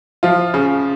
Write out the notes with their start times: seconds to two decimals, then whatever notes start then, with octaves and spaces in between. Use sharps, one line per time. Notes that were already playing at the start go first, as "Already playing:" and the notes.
0.23 F3 F4
0.54 C#3